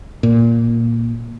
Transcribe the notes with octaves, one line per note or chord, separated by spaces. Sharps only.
A#2